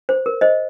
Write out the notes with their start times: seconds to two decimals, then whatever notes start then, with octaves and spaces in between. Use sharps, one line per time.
0.09 C5
0.26 A#4
0.41 C5 D#5